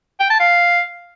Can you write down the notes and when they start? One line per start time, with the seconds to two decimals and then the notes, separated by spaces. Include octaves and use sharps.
0.20 G5
0.30 A5
0.40 F5